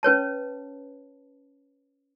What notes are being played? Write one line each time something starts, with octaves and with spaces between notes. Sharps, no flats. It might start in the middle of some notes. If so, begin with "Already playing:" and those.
C#4 B4 C#5 A5